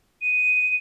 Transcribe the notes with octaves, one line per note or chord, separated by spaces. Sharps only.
D#7